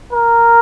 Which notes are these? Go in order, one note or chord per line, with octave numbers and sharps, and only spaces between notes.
A#4